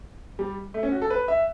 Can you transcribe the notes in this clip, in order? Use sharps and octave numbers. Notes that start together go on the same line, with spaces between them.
G3
A3
C#4
F#4
A4
B4
E5